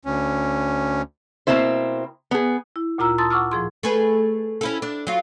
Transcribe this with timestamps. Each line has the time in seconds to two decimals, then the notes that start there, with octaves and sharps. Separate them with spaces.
0.05 D2 C#4
1.47 B2 A#3 C4 E4 C5
2.31 B3 G#4
2.76 E4
2.98 D2 A#2 F4 A#5 E6
3.18 A5 A#5 C6 D#6 E6 A6
3.30 F#5 C#6 D6 E6 F6
3.51 A2 F3 G#4 C6
3.83 A3 G#4 B4
4.61 C#4 E4 A4
4.82 D4
5.07 F#3 F4